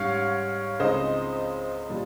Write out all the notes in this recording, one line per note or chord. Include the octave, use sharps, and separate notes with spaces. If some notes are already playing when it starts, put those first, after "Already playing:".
Already playing: G#2 G3 C#4 C#5 F5
C#2 C#3 G#3 C4 D#4 C5 D#5
A#2 G3